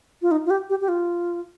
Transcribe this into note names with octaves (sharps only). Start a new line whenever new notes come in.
F4
D#4
F4
G4
G4
G4
F4